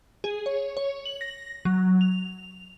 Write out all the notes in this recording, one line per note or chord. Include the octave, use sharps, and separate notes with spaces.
G#4
C#5
C#5
F#7
A#6
F#3
F7